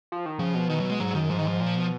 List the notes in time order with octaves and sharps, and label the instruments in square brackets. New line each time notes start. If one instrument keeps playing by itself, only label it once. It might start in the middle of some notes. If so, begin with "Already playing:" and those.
[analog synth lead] F3
D#3
[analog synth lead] C#3 [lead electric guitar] F3
[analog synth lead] B2
[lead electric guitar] D#3
F#3
G#3
[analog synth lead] G#2 [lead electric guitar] F#3
[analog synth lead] F#2 [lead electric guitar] D#3
[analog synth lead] G#2 [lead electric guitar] F3
[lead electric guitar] D#3
[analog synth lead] G#2 [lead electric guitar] F3
[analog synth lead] A#2
B2